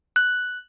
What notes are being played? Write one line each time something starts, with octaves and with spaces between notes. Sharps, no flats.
F#6